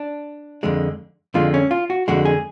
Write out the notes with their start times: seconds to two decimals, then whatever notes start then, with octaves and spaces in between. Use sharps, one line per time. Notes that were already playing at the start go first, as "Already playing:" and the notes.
Already playing: D4
0.63 F2 D3 G#3
1.34 F2 D3 G#3 F4
1.54 C#4
1.71 F4
1.90 F#4
2.08 F2 D3 G#3 F#4
2.25 G#4